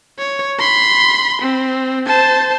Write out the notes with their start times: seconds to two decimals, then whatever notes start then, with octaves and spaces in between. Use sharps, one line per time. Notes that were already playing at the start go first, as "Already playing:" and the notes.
0.18 C#5
0.59 B5 C6
1.41 C4
2.06 C5 A5